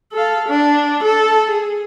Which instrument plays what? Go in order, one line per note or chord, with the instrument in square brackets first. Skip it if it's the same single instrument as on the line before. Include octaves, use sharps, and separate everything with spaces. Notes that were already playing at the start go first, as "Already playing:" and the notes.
[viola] A4 F5
D4
A4
G#4